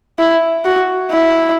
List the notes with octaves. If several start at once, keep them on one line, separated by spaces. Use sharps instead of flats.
E4
F#4
E4